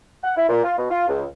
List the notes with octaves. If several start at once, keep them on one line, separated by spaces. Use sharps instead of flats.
F#5
E4
A#2
F4
B2
F4
C#2